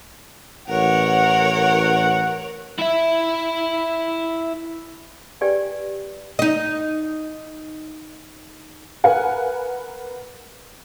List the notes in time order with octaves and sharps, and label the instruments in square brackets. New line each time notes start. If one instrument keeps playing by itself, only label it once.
[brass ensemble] A1 F#5 [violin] A#4 C#5
[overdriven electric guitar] E4 E5
[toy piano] G4 B4 D5 G5 G#5
[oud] D#4 D#5
[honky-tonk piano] A#4 B4 F5 F#5 G#5